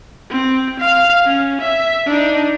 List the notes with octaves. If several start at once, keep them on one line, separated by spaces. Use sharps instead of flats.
C4
F5
C#4
E5
D4 D#4